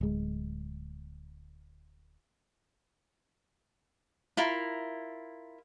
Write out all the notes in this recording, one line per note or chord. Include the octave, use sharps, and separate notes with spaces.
D1 G#3
E4 F4 A#4